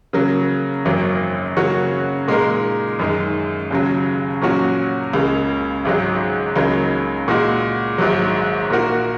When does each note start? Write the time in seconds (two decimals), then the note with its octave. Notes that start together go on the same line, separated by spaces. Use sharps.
0.13 C#3 F#3 A#3
0.85 G#1 F#2 F#3 A#3
1.57 C#3 F#3 A#3 C#4 F#4
2.28 A#2 G#3 D#4 A#4
2.99 F#2 D#3 G#3
3.71 D#2 C#3 F#3
4.42 A#2 F#3 C#4 F#4
5.13 C#2 C#3 A#3
5.85 G#1 G#2 F#3
6.56 C#2 C#3 F#3 A#3 D#4
7.28 A#2 G#3 F#4
7.98 A#1 G#2 D#3 F#3
8.70 A#2 A#3 F#4 A#4